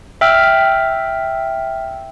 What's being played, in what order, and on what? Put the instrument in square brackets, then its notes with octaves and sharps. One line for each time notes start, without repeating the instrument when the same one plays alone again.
[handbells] E5 G5 E6 F6